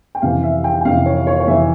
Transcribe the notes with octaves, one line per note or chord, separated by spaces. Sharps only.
G5
F2 C3 E3 F5
E5
G5
G5
F2 C3 E3 F5
C#5
C#5
C#5
F2 C3 E3 E5